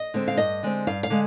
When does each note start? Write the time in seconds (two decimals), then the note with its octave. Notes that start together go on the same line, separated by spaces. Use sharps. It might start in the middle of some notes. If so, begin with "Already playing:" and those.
Already playing: D#5
0.14 D3 G#3 C4
0.28 F5
0.37 G2 D#5
0.63 D3 G#3 C4
0.87 G2 F5
1.03 F5
1.10 D3 G#3